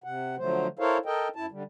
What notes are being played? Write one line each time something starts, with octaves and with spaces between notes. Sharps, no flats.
C3 F#5
D3 F3 F#3 A3 C5
E4 A4 A#4 C5 C#5 F5
A4 A#4 D#5 G5
F#2 E4 A5
D3 G3